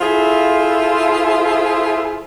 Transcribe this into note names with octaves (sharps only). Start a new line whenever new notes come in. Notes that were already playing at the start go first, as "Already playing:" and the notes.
E4 F4 G#4 A4 C5 E5